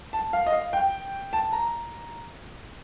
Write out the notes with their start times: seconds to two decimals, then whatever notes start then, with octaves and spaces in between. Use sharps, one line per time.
0.13 A5
0.33 F5
0.47 D#5
0.52 F5
0.73 G5
1.33 A5
1.53 A#5